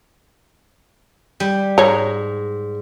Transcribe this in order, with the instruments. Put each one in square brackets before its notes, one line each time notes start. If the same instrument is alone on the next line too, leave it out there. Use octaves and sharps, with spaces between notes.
[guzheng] G3
[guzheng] G#2 [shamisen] C#5 A#5